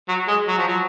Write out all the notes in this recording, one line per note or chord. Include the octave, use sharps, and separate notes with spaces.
F#3
G#3
F#3
F3
F#3